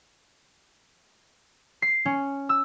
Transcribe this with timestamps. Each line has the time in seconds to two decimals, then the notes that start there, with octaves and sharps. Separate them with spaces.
1.82 C7
2.05 C#4
2.49 E6